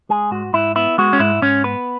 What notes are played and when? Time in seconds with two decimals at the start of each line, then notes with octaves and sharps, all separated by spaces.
0.09 G#3 G#4
0.31 G#2 F#4
0.53 G#2 E4
0.76 B3 E4
0.98 G#3 F#4
1.13 C#4
1.19 G#2 E4
1.42 G#2 C#4
1.64 B3 B4